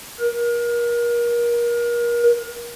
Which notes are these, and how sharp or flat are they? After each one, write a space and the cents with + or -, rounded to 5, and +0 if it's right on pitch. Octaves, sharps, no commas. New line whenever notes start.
A#4 +30